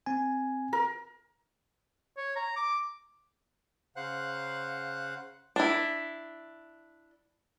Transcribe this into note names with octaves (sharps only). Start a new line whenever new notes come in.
C4 G#5
A#4
C#5
A#5
D6
C#3 C5 F5 F#5 F#6
D4 E4